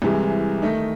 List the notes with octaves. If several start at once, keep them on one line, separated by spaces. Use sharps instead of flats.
C2 C3 E3 G#3
D#3 A3 D#4